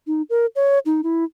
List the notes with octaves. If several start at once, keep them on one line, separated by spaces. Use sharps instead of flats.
D#4
A#4
C#5
D#4
E4